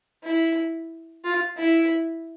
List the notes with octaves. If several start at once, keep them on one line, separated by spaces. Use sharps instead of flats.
E4
F4
E4